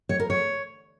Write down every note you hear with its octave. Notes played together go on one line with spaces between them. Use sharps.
C#5
A#4
C#5